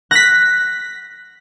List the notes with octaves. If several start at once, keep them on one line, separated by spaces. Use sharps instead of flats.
F#6 A#6 B6